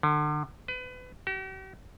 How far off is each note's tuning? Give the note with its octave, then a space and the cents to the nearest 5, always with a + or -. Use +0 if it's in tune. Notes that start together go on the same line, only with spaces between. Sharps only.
D3 +35
B4 +30
G4 -45